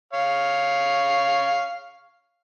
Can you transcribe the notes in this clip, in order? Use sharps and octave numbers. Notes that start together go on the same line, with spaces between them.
C#5 F5